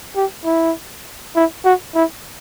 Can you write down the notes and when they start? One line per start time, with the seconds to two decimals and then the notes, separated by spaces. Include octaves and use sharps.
0.16 G4
0.45 E4
1.36 E4
1.65 F#4
1.95 E4